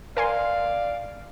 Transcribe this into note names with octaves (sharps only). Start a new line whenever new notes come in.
A#4 D5 F5 G#5 C6